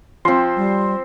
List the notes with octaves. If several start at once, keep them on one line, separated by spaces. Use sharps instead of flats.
F3 C4 C6
G3